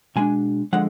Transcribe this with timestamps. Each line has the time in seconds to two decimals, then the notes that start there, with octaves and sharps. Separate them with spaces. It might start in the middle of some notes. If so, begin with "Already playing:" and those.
0.16 B2 G#3 D4 G#5
0.73 D3 F3 G#3 F#5